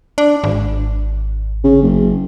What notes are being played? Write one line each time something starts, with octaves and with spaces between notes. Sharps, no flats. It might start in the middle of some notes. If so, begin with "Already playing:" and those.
D4
G#1
C#3
F#1